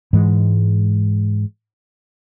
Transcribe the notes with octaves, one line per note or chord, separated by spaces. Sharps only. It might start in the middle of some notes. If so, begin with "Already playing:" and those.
G#2 E3 G#3